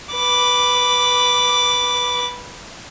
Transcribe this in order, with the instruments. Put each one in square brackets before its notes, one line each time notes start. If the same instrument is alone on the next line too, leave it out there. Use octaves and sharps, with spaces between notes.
[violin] B4 D6